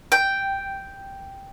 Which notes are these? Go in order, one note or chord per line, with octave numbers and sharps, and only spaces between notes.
G5